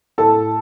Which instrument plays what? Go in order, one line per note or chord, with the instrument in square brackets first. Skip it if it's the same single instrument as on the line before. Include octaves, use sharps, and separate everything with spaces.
[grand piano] A2 A4 A5